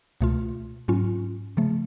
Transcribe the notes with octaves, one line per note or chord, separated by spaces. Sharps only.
C#2 B2 A3 F4
G#2 F#3 C#4 F4
C#3 F3 A3